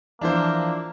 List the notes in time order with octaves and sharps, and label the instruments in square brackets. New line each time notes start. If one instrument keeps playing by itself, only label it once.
[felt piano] E3 F3 [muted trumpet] A#3 [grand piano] D4 E4 C5